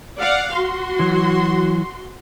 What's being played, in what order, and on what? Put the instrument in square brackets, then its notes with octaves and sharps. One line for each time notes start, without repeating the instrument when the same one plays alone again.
[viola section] D5 F5 F#5
F#4 C6
[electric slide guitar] E3 F#3